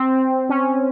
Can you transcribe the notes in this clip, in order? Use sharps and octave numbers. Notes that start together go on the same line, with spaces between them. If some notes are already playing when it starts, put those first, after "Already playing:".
Already playing: C4
C#4